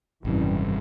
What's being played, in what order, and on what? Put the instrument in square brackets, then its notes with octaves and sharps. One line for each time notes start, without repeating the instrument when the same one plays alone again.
[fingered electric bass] G#1 C3 [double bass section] F#2 E3 G3